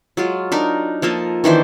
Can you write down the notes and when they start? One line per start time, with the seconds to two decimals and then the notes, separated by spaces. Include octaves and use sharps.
0.17 F#3 G#3 F4
0.52 D4 D#4 A#4
1.02 F3 A#3 A4 D#5
1.44 D#3 E3 D4 C5